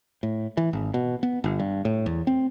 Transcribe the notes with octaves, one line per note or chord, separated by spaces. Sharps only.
A2
E3
G#1
B2
B3
G1
G2
A2
E2
C4